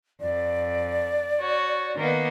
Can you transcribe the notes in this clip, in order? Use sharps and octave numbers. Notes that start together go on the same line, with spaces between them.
F2 D5
F#4 C#5
D#3 A#3 B3